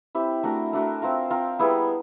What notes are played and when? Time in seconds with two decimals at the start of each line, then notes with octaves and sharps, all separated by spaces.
0.15 C4 E4 G4
0.43 A3 D4 F#4 A#4
0.73 A3 D4 F#4 A#4
1.02 C4 F4 A#4
1.30 C4 F4 A#4
1.59 G3 B3 E4 G#4